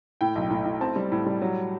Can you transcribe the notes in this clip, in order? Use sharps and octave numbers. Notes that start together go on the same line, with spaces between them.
A2 G5
B1
A2
A2
C4 A5
G3
A2
G3
F#3